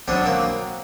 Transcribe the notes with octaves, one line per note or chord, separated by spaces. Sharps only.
B2 F#3 C4 D4
A#3 C4